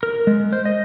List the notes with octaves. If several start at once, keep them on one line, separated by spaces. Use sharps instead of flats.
A#4
G#3
C5
D#5